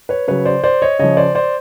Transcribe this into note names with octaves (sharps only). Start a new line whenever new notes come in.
B4 C#5
C#3 F#3 B4 C#5
C5 D5
C5 D5
C#5 D#5
C#3 F3 C#5 D#5
C5 D5
C5 D5